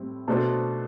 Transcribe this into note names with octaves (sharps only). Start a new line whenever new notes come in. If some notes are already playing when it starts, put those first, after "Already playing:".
Already playing: A2 G3 C4 E4
B2 A3 D4 A4 C5